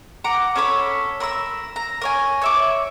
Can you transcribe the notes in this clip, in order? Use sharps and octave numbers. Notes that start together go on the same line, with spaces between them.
F#5 A#5 D6
C#4 A4 C#5 B5
A#4 B5 C#6 E6
A#5
A#4 C#5 G#5
C#5 E5 D6